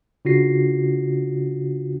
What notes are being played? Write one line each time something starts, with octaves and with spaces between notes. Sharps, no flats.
C#3 D4 F4 F#4 A#6 C7